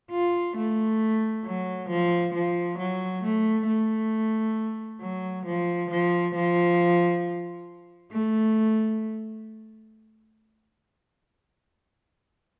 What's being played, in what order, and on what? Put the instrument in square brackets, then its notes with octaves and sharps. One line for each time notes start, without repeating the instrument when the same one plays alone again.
[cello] F4
A3
F#3
F3
F3
F#3
A3
A3
F#3
F3
F3
F3
A3